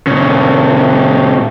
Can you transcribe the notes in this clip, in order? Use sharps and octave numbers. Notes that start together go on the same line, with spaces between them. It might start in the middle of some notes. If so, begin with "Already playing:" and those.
A#2 C#3